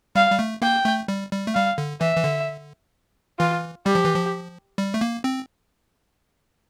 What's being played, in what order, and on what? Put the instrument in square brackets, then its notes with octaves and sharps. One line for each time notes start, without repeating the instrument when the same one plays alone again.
[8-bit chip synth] G3 [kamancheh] F5
[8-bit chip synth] G3
A3
[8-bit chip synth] A#3 [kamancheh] G5
[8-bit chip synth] A3
G3
G3
A3
[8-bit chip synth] G3 [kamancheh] F5
[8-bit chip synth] D3
[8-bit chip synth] E3 [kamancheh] E5
[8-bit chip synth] E3
D3
[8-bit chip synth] E3 [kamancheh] F4
[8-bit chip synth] G3 [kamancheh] G4
[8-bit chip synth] F3
E3
F3
G3
A3
A#3
C4